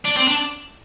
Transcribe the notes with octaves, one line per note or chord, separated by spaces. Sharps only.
D4
C4
D4